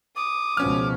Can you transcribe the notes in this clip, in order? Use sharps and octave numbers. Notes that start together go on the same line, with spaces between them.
D6 D#6
C#2 B2 F3 C#4 F6